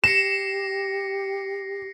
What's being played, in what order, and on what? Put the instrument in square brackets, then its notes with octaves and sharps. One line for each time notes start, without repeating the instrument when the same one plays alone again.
[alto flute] G4 [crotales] A#6 C7 C#7 [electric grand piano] E7